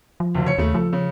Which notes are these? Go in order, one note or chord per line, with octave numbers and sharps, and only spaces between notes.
F3
F#1 D2
C#5 C#7
D#2 C#3 A3
F3 A4
C#3